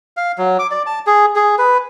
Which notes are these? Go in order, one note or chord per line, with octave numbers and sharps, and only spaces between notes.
F5
F#3
D6
D5
A5
G#4
G#4
B4